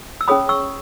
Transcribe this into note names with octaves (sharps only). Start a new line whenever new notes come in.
E6
C#4 G#4 C#5 B5 D#6
C#6 E6